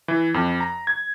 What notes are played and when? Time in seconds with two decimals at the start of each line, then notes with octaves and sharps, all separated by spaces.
0.08 E3
0.34 F2
0.61 A#5
0.87 G#6